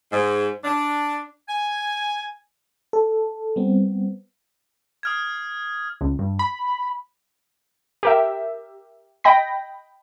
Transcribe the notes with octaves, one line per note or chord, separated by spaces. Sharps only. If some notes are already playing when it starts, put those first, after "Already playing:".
G#2
D4
G#5
A4
G3 B3 C4
D#6 F6 G#6
C#2
G2
B5
G4 A#4 E5
D#5 G5 B5 A#6